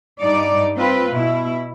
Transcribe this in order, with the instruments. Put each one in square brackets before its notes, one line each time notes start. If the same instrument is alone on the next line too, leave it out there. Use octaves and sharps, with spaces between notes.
[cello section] G2 D#4 D5
C4 F4 B4
B2 E4